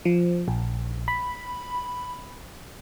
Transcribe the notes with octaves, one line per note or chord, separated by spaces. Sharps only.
F3
A#1
B5